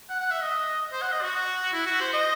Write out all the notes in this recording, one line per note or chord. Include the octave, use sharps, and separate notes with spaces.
F#5
F#5
E5
D#5
C5
F#5
D#5
F#4
E4
F#4
C5
D#5